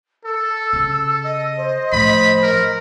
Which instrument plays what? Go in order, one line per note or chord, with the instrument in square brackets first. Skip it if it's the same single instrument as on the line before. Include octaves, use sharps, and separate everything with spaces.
[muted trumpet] A4 [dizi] E6
[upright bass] C#3
[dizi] D#5
[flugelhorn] C5
[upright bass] A2 F3 [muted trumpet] B5
[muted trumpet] A#4